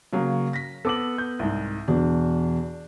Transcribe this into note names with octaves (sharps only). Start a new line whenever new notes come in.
C#3 F#3 A#3
A#6 B6
B3 A4 D6 F#7
G6
C2 G#2
E2 B2 D4